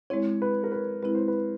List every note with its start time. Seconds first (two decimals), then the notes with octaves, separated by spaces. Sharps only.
0.10 G#3 C4 E4 C#5
0.42 B4
0.64 A#4
0.72 B4
1.02 G#3 C4 E4 B4
1.15 C5
1.28 B4